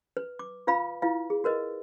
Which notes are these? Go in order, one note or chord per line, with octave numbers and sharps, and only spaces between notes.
B4
D6
F4 B4 F5 B5
E4 F4 B4 F5
G#4
F#4 A#4 B4 D#5